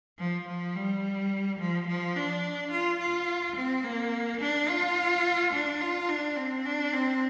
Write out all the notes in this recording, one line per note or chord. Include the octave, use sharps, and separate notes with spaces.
F3
F3
G3
F3
F3
D4
F4
F4
C4
A#3
D4
F4
D4
F4
D4
C4
D4
C4